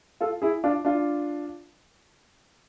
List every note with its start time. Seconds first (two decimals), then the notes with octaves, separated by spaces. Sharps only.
0.21 F4 A4
0.42 E4 G#4
0.64 D4 F4
0.85 D4 F4